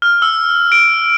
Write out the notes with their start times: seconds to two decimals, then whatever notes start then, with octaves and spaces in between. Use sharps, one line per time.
0.02 F6
0.22 E6
0.72 D7